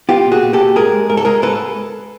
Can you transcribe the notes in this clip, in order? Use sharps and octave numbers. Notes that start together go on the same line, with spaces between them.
B3 F4 G4
A#2
F#4 G#4
A#2
G4 A4
A#2
G#2 G#4 A#4
G#3
G#2 A#4
A4
G#3 G#4 A#4
G#2 A4 B4